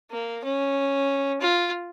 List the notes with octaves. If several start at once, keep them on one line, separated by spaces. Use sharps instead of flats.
A#3
C#4
F4